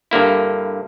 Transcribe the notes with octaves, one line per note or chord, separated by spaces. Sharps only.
G2 D3 A#3 E4